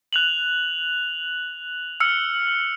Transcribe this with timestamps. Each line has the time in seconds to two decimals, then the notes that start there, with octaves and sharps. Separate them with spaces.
0.13 F#6 F7 F#7
2.00 E6 F6 C#7